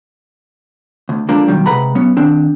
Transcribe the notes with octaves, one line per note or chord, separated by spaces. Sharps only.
D2
D3 F3 G#3 A#3 D4
B2 D#3 F#3 G3
C3 G#3 B4 F#5 A#5 B5
F#3 B3 C#4
D#3 C4 D4